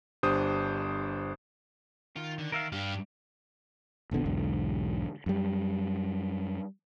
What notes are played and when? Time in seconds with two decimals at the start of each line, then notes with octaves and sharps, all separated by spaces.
0.23 G1 D4 G4 C5 D#6
2.16 D#3 F4
2.38 D3
2.52 D#3 A#4 E5 F5
2.72 G2 D4 G4 F5
4.11 F1 A#1 D3 B3
4.25 B1 E2 G#2 D3
5.26 F#2 G3